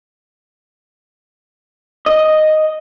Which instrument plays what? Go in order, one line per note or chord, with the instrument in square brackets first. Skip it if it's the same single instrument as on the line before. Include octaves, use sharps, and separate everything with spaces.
[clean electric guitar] D#5